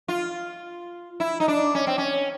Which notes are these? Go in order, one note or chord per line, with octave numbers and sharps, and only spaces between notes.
F4
E4
D#4
D4
C#4
C4
C#4